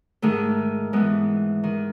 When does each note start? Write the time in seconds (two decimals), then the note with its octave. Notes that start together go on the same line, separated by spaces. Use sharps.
0.22 G#2 D#3 A3
0.93 G#2 E3 G#3 B3
1.64 D#3